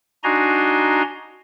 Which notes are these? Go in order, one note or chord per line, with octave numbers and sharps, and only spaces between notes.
D4 D#4 F#4 G#5 A#5 C6